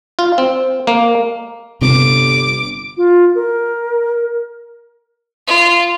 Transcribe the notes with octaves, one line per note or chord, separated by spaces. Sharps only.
F4
C4
A#3
G1 C3 D6
F4
A#4
F4